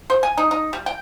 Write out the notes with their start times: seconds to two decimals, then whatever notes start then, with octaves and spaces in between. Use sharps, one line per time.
0.10 C5
0.23 G#5
0.38 D#4
0.51 D#4
0.73 G3
0.86 G5